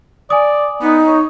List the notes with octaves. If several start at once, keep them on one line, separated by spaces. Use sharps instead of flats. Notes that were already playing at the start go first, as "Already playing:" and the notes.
D5 G#5 D#6
B3 D#4
C#5